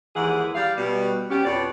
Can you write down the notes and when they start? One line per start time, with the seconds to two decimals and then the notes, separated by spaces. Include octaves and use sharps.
0.16 D#2 G#2 E3 G#4 F#5
0.55 G3 F5
0.77 B2 G3
1.30 B2 B3 C#4 G4
1.45 F2 B2 C#5 D5